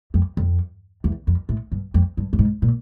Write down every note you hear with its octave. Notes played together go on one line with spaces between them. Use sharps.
F2
F2
E2
F2
A2
G2
F2
G2
G2
G#2
A#2